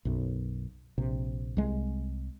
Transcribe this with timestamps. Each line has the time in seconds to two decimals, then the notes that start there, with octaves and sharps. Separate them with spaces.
0.05 B1 F#2
0.98 A#1 C3
1.57 C2 G#3